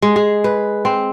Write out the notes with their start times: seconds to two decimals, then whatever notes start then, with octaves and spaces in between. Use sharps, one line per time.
0.02 G#3
0.16 G#4
0.44 B4
0.85 C4